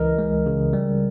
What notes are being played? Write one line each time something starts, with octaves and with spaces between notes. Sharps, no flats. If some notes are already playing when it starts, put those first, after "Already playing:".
Already playing: C#2 E3 A#4 D#5
G#3
C#3
G3